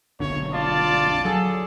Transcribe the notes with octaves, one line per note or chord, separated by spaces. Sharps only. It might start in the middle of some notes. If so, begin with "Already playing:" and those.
F#1 B1 D3 C#5
F4 D5 A5
F#3 G#4 A4